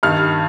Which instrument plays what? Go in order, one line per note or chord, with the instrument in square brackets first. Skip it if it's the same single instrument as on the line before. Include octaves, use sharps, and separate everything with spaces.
[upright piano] G2 D#3 F6